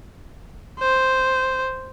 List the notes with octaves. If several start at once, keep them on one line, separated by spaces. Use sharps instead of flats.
C5